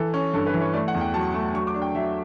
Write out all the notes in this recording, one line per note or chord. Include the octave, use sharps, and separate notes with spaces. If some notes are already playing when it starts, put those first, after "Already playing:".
Already playing: E3 A4
C#4
G2 A4
B4
E3
C#5
A3 D5
F#5
E2
G5
F#3 A5
A3
F#3 C#6
D6
D4
G5
F#3 E5